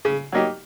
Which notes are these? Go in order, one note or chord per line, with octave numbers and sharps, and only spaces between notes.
C#3
F#3 A#3 D#4 G4